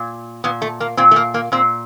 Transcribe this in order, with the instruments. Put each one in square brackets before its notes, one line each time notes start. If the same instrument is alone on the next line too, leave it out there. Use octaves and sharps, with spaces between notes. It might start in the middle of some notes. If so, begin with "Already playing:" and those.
Already playing: [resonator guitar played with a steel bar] A#2
A#2 B3
A3
A#3
A#2 C4
A3
A#3
A#3
A#2 C4